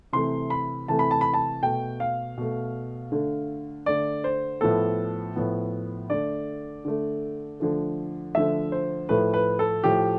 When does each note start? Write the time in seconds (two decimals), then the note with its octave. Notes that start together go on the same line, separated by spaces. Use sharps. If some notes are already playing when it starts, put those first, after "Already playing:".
0.13 C3 E3 A3 C6
0.50 B5
0.88 C3 E3 A3 A5
0.99 B5
1.11 A5
1.21 B5
1.34 A5
1.63 B2 A3 G5
2.00 F5
2.38 B2 A3
3.12 D3 A3
3.86 D3 A3 D5
4.24 C5
4.61 A2 F3 B3 A4
5.36 A2 F3 B3
6.10 D3 A3 D5
6.85 D3 A3
7.60 D3 F3 A3
8.35 D3 F3 A3 E5
8.72 C5
9.09 A2 F3 A3 B4
9.34 B4
9.59 A4
9.84 A2 F3 A3 G4